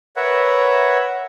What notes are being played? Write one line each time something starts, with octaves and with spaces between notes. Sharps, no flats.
A#4 B4 C#5 E5 F#5